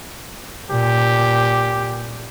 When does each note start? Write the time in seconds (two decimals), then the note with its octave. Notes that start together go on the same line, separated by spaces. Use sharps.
0.71 A#2 G4